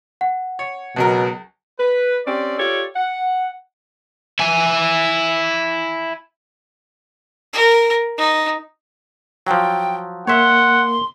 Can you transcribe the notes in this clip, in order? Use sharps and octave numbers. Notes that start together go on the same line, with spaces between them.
F#5
C#5
C#2 B2 F#3 A#4
B4
C4 C#4 G4 D5
F4 G4 A4 C#5 D5
F#5
E4 G#5
A#4
D#4
F3 F#3 G5
A#3 A#4 C#5 E5 F#5 C6